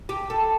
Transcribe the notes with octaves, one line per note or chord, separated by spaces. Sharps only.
G4
A4